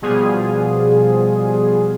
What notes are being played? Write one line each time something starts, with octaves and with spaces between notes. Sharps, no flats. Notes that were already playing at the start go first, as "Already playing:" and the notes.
B2 F3 G3 B3 F4 G#4